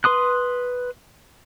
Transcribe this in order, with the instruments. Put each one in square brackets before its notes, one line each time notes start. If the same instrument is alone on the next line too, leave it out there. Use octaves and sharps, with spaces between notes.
[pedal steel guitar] B4 C6 D#6 F#6